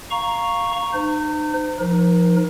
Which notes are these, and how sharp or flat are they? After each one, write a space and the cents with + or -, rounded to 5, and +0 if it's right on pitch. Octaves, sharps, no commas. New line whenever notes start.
F5 +0 A#5 +0 C#6 +0
D#4 -40 C5 -35
F3 +0 D#4 +0 A#4 +35